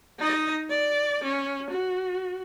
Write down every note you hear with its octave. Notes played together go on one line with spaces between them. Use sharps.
D#4 D#5
D5 D6
C#4
F#4